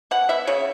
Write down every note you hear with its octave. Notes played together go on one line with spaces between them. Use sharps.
B2 F#5
B3 E5
C#3 C#5